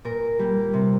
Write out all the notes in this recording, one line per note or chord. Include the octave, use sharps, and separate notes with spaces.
A#2 A#4
G3 A#3
C3